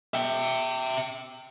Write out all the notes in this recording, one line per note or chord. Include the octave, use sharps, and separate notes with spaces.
E5 G5